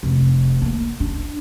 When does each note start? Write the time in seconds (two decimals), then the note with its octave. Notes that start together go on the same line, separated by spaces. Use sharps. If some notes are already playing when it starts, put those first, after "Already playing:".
0.03 F1
0.62 A#3
1.00 D4